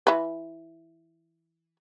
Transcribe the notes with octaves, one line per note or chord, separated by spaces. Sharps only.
E3 B4